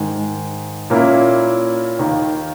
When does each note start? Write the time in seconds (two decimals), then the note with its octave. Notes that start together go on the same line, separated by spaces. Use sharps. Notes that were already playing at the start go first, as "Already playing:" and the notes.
Already playing: G#2 D#3 G#3
0.90 A#2 A#3 C#4 E4
1.99 D#2 D#3 A#3